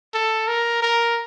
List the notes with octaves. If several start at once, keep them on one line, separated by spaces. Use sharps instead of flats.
A4
A#4
A#4